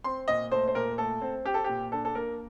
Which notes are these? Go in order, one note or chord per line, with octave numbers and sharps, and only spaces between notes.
C4 C6
A#2 D#5
A3 C5
C5
A#2 A#4
A3 A4
C4
C4 G4
A4
A#2 G4
D4 A4
A4
A#3 A#4